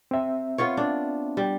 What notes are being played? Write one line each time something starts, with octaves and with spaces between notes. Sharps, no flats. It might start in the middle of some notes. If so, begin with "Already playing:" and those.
C4 E5
B3 F4 C#5
D4
G3